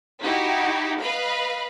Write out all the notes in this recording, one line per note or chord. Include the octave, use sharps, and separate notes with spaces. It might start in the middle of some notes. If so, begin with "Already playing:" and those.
D#4 E4 F#4 G4
B4 D#5 F5 B5